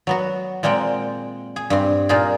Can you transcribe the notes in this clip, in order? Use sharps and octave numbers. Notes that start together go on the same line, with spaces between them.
F#3 B3 F#4
A#2 G#3 A#3 C4 F#5 G5
G#4
G2 C4
A#2 D#4 F4 G#4